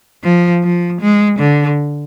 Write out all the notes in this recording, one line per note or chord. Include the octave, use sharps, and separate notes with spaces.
F3
F3
G#3
D3